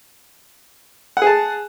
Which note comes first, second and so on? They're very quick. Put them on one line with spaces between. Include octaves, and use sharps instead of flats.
F#5 G#4 A5